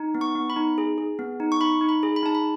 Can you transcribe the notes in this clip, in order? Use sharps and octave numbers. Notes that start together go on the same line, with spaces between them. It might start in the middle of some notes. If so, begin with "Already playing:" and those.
Already playing: D#4
B3
C#6
B3
B5
D#4
G#4
G#4
B3
D#4
C#6
D#4 B5
D#4
B5
G#4
B5
D#4 A5
B5